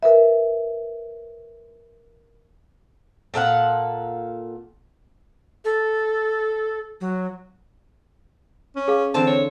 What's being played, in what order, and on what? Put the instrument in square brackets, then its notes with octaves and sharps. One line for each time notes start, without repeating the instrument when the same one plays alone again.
[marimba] A#4 B4 E5
[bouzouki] A#2 A4 F5 F#5
[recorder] A4
F#3
[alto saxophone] C#4
[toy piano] G#4 F5
[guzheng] D3 E3 F4 [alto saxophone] C4 [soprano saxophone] A5
[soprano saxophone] C#5